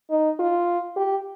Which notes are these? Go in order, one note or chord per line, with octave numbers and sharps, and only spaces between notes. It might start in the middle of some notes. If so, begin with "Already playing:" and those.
D#4
F4
G4